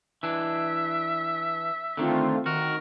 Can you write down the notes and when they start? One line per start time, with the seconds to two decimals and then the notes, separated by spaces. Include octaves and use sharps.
0.23 E3 D4 E5
1.97 D3 D#3 A3 C4 F4
2.46 D#3 F#4 A#4